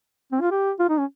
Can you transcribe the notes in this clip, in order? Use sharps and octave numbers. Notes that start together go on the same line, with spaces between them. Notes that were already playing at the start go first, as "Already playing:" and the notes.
C4
F4
G4
F4
D#4
C#4